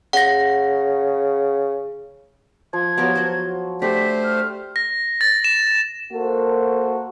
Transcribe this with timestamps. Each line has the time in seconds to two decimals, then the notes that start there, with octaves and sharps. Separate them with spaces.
0.13 C#3 F#5 A#6
2.73 F3 G#6
2.98 F3 F#3 B3 G4 A#4
3.15 F#4 C5
3.82 A3 D4 G4 C5 B6
4.23 F6
4.76 A#6
5.21 A6
5.44 E7
6.13 A#3 F#4 A4 A#4 C5